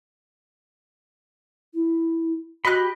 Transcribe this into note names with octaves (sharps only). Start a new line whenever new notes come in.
E4
F#4 G4 D#5 B5 F#6